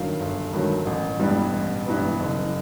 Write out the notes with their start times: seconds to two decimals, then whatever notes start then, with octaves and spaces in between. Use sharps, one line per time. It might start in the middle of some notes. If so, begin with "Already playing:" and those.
Already playing: G1 G2 D#3 F#3 F5
0.20 G1
0.53 G2 D#3 F#3
0.86 A1
1.19 G2 E3 G3 B3
1.53 A1
1.86 G2 E3 G3 B3
2.20 F#1